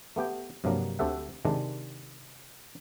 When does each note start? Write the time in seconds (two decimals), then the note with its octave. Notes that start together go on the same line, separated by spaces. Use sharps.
0.16 A3 B3 G4 G5
0.64 G2 C3 F3 F#3 A#3
0.99 D2 C4 G4 A4 E5 F#5
1.45 C3 D#3 G#3 D4